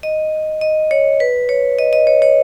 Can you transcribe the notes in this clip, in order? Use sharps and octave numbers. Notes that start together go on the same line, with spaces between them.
D#5
D#5
C#5
B4
C#5
D#5
D#5
C#5
C#5